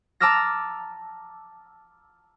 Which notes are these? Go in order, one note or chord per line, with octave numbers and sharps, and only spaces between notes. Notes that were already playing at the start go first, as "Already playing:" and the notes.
A5 A#5 D6 E6 F6 A#6